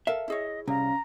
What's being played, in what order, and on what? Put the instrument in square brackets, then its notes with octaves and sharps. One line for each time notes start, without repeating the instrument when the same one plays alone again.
[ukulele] A4 A#4 F5 [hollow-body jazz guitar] E5
[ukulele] E4 G#4 C#5 [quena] D#5
[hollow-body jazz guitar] C2 [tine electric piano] C#4 F5 [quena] A#5